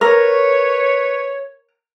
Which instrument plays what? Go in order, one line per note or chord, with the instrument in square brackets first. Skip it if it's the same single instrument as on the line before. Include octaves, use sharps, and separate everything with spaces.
[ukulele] A#4 [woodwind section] B4 C#5